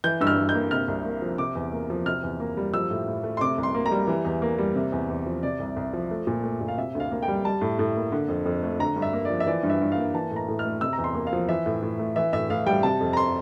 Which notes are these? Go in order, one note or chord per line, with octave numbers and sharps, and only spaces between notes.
E3 G6
G2 E6
F6
G2
G6
A#3
C3 F6
C2
A#3
F3
C3 D6
E2
A#3
F3
C3 F6
E2
A#3
G3
F3 E6
A2
A2
A3
C6
C3 D6
C2
C6
A#3
A#5
G3
E3
E2
A#3
G3
C3
E2
E2
F3
C3 D5
C2
C2
F3
A3
A#2
A3
A#2
F5
C3 E5
D2
F5
A#3
G5
G3
G3 A5
A2
A2
A#3
D3
F2
F2
A3
D3 A#5
G2
E5
A#3
F3 D5
E5
E3 D5
G2
E5
G2
F5
A#3
E3 A5
A2
A#5
A2
F6
A3
C3 E6
A#5
E2
C6
A#3
F5
F3
E3 E5
A2
A2
A3
E3 E5
A2 E5
A2 F5
G3 G5
C3 A5
F2
A#5
C6